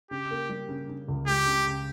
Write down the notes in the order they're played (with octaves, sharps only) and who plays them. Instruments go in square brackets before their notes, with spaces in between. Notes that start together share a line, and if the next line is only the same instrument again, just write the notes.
[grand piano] C#3 [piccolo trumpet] G4
[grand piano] A#3
G3
C#3
C#3
C#2
[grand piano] G#3 [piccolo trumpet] G4
[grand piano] C#3
C#3